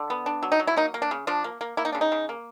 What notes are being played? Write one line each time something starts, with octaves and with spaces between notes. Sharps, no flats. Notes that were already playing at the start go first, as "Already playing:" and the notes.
Already playing: D3
B3
D4
F#3
D#4
F#3
E4
A#3 D#4
A#3
D4
C#3
F3 D4
A#3
A#3
A#3 E4
D#4
C#3 D4
D#4
C#3
A#3